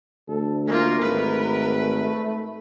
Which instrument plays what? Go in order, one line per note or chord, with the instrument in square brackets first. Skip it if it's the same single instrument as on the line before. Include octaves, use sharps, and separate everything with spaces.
[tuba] D2 [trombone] A4
[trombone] A3 [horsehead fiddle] A#3 F4 [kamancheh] A#4
[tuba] G#1 [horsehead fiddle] B4